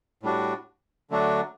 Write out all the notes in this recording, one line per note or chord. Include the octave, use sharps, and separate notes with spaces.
A2 G3 D4 F#4
D3 F#3 A3 D4 F#4